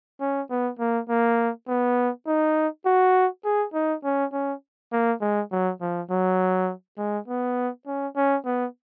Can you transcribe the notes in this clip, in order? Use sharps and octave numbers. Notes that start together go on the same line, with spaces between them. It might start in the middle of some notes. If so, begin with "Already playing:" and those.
C#4
B3
A#3
A#3
B3
D#4
F#4
G#4
D#4
C#4
C#4
A#3
G#3
F#3
F3
F#3
G#3
B3
C#4
C#4
B3